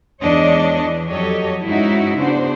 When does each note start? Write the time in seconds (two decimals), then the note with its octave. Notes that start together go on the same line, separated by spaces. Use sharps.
0.20 E2 G#3 D4 C#5 D#5
0.79 E3
1.09 F2 F#3 G4 A4 C#5 D#5
1.65 G#2 C#4 D#4 E4 F#4 E5
2.18 C#3 B3 D4 F#4 C5